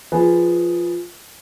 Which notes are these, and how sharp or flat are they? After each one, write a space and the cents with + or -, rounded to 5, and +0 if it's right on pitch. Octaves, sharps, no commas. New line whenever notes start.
F3 +0 G#4 +0 B4 +0